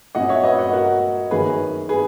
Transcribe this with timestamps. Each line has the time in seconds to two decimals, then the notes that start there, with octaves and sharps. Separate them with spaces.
0.15 A#2 F#3 C#4 D#5 F#5
0.29 C#5 E5
0.44 B4 D#5
0.59 D#5 F#5
0.73 F#4 A#4
1.31 F#2 D#3 A#3 C#4 G#4 B4
1.89 G#4 B4